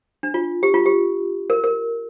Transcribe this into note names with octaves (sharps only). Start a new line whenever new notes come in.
D4
F4
G4
F4
G4
A#4
A#4